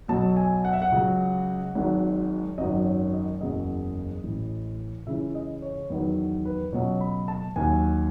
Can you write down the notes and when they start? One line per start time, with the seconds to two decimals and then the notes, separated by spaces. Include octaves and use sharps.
0.08 B1 B2 F#3 A5
0.37 G#5
0.65 F#5
0.73 E5
0.82 F#5
0.92 C#2 C#3 F#3
1.75 G#1 G#2 D#3 F#3
2.58 G#1 F#2 D#3 F#3 D#5
2.85 C#5
3.13 D#5
3.41 F#1 E2 C#3 F#3 D#5
4.24 A1 A2 E3
5.07 C#2 C#3 E3 E5
5.35 D#5
5.62 C#5
5.90 E2 D#3 F#3 B4
6.45 B4
6.72 C#2 B2 F#3 C#5
7.01 B5
7.28 A5
7.56 D#2 D#3 F#3 G#5